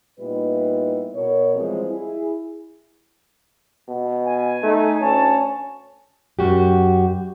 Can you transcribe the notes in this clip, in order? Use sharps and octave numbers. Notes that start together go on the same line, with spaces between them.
A#2 G3 B3 D#4 E4 B4
B2 A#4 C#5
E3 F3 G3 G#3 C4
E4 G#4
B2
G#5
A3 D#4
D2 C#4 C#5 A5
F#2 F#4 G4